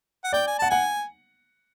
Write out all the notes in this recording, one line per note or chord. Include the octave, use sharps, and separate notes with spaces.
F#5
D5 G5
G#5
F#5 A5
F#5 G#5